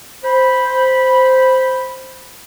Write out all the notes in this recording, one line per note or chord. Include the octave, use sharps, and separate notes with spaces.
C5 B5